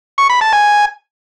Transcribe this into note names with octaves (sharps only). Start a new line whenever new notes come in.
C#6
B5
A5
G#5